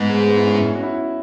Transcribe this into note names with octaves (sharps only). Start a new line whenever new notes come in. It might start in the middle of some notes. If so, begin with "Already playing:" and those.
Already playing: G#2 B3
G#3
G#3
B3
E4
C#4
E4
C#4
F#4
E4